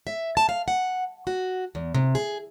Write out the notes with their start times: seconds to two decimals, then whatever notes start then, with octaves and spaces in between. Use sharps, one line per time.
0.07 E5
0.37 A5
0.49 F5
0.68 F#5
1.27 F#4
1.75 E2
1.94 C3
2.15 G#4